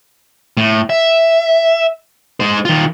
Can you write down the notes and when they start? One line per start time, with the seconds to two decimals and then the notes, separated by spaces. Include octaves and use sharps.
0.57 A2
0.90 E5
2.40 G#3 C5
2.65 D#3 F4